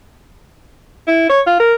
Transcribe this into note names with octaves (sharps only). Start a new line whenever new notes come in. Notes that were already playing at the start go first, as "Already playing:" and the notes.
E4
C#5
F4
A#4